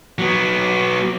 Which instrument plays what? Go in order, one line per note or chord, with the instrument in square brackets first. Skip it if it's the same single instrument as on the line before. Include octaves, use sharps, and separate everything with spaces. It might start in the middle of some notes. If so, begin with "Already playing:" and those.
[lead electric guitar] F#3 B3